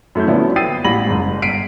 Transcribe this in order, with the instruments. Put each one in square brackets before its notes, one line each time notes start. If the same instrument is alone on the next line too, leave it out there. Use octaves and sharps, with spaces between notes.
[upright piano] F#2 A3 E4 G6
A#2 D3 F3 B3 C#4 E4
G5 D#6 E6 A6 C7 D#7
A1 A#2 B5 A#6 F#7
F#1 G#2
G1 B6 C7 D7 D#7